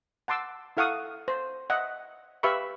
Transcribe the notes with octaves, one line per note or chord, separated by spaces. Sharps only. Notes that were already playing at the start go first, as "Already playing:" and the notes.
F#5 A5 C6 D6 E6
E4 A4 F5 F#5 C#6 D#6
C5
D#5 E5 F#5
G4 B4 E5 F5 B5 C#6